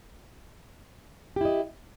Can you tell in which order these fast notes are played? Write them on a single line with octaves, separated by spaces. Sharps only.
G4 E4 D#5